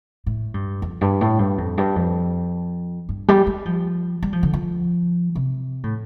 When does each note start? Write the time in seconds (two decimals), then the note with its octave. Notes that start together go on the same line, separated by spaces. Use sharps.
0.26 A2
0.54 G2
0.82 F2
1.01 G2
1.21 A2
1.39 G2
1.58 F2
1.78 G2
1.96 F2
3.09 G2
3.28 G3
3.47 G3
3.66 F3
4.23 G3
4.33 F3
4.43 D3
4.54 F3
5.35 C3
5.83 A2